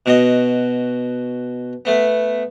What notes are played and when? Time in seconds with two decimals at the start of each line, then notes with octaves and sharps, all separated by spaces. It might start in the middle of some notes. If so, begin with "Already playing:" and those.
0.06 B2 F#4 D#5
1.85 A3 B3